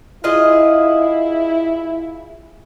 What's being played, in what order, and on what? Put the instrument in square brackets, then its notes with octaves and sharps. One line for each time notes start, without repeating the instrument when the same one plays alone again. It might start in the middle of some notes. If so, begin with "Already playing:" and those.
[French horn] E4 [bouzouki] F4 G#4 D#5